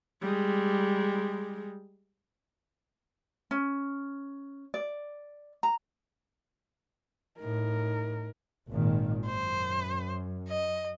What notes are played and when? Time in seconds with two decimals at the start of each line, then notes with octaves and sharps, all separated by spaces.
0.21 G3 G#3
3.51 C#4
4.74 D5
5.63 A#5
7.40 A2 D#4 A#4
8.70 G#1 A#2 D#3
9.27 F#2 C5
10.48 D#5